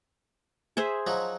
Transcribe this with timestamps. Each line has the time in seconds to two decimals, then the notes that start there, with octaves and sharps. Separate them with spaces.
0.77 G#4 C5 E5
1.07 F3 F#3 D#4